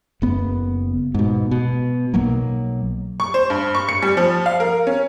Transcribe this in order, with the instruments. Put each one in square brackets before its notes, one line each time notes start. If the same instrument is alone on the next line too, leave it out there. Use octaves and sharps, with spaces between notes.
[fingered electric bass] F#1 B3
G#2 B2
B2
B1 F#3 A#3
[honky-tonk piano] C#6
C5
G2
C#6
C#7
G3
F3
F5
A#4
C#4